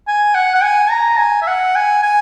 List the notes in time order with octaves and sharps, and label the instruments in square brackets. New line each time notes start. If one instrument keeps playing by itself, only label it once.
[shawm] G#5
F#5
F#5
G#5
A#5
G#5
E5
F#5
G#5
G#5